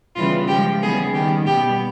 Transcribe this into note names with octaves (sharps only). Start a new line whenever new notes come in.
C#3 E3 G3 B3 F4
C#3 F3 G#3 G4
C#3 E3 G3 B3 G#4
D#3 G3 B3 G4
B2 G3 B3 G4